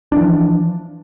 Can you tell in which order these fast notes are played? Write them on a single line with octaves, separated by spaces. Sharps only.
D4 E3 F3